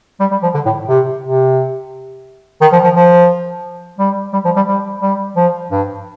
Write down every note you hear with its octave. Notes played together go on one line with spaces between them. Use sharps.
G3
G3
F3
D3
A2
C3
C3
D#3
F3
F3
F3
G3
G3
F3
G3
G3
G3
F3
G2